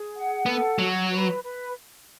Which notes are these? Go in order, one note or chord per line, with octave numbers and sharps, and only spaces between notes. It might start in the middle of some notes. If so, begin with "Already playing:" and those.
Already playing: G#4
F#5
B3 A4
F#3 F#4
B4
B4